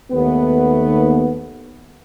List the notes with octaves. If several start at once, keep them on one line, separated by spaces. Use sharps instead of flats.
D#2 A3 B3